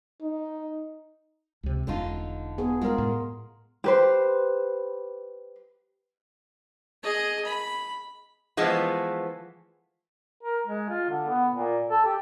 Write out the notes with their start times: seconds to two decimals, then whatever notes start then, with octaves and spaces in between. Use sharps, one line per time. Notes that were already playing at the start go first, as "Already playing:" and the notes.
0.22 D#4
1.63 C#2 C3
1.87 E1 D3 C#4 D#4 F4
2.58 B3 G#4
2.82 G#3 F4 A#4
2.98 A2
3.84 G4 B4 C5
7.03 G#4 D#5
7.45 B5
8.57 E3 F3 G#3 A3 B3
10.43 A#4
10.67 G#3
10.89 F4
11.10 D3
11.28 B3
11.54 A#2
11.90 A4
12.05 G4